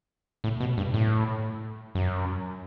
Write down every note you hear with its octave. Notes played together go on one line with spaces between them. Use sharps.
A2
B2
G2
A2
F#2